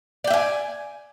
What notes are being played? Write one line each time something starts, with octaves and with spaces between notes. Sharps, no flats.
D5 E5 G5 G#5